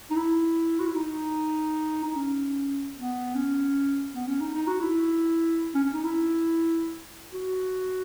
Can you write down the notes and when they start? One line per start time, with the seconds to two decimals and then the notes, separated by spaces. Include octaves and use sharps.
0.11 D#4
0.17 E4
0.80 F#4
0.87 E4
0.95 D#4
2.05 D#4
2.16 C#4
2.96 B3
3.35 C#4
4.14 B3
4.28 C#4
4.41 D#4
4.54 D#4
4.68 F#4
4.81 E4
5.75 C#4
5.85 C#4
5.94 D#4
6.04 E4
7.33 F#4